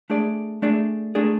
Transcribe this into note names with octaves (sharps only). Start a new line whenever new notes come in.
A3 D4 G#4 D5
A3 D4 G#4 D5
A3 D4 G#4 D5